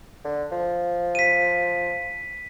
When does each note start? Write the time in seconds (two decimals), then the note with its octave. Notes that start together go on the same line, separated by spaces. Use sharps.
0.24 D3
0.51 F3
1.15 B6 D#7